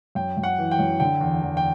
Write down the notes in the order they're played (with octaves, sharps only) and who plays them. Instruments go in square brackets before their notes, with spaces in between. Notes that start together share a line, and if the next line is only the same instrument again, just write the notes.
[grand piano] F#2 G5
F#2
F#5
E3
G5
F#2
D3 G5
E2
E2
G5